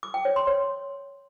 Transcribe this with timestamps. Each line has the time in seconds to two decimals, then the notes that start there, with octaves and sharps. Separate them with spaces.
0.03 D6
0.14 G5
0.25 C#5
0.36 C6
0.47 C#5